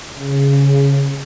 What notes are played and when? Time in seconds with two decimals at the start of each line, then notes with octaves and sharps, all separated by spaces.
0.14 C#3